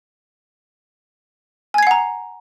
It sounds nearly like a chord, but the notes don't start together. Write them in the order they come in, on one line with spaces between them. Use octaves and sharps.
G#5 G#6 C7 F#5 A#5